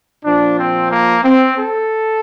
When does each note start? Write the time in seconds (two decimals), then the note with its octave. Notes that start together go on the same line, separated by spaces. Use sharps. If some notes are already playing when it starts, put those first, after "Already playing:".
0.25 A#2 F3 D4
0.58 C4
0.91 A#3
1.24 C4
1.57 A4